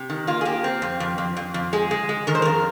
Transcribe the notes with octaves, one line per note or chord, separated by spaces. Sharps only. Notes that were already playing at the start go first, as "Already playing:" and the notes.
Already playing: C3
D#3
A#3 F4
G#4
A#3 G4
C4
F2
F2
F2
F2
F2
G#3 G#4
G#3
G#3
D#3 A#4
C5
F2 A#4